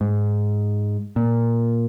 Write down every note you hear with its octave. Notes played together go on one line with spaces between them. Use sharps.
G#2
A#2